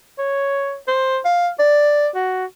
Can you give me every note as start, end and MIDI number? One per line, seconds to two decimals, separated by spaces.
0.18 0.76 73
0.88 1.19 72
1.25 1.50 77
1.59 2.08 74
2.15 2.45 66